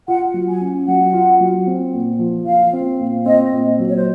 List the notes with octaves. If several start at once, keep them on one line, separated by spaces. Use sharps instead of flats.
F4 F#5
F#3
G#5
C#4
F#3 F#5
F4
F#3
C4
A#2
F3
F4 F5
C4
A#2
C4 D#5
A#2
F#3
C#5
C5